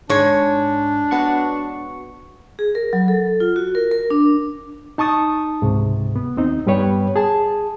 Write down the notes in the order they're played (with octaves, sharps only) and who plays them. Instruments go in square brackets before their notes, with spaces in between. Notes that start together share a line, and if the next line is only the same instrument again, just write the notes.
[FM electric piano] G#2 [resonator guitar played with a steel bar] G#3 C#5 [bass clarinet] D4
[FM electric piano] B3 F#4 C#6
[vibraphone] G#4
A#4
F#3
A4
F4
F#4
A#4
A#4
D4
[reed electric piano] D#4 A5 C#6 D#6 A6
C#2 G#2 C3
B3
D#2 C4 D#4
G2 G3 B3 B4 C#5 G5
G#4 A5